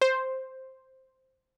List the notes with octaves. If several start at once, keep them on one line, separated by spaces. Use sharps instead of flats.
C5